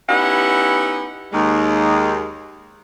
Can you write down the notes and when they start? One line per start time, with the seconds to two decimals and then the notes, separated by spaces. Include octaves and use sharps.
0.08 B3 C#4 D#4 E4 G4 F#5
1.32 D#2 G#3